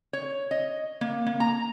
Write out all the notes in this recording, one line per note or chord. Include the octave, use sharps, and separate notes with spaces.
C#5
D#5
A#3
A#3
A#5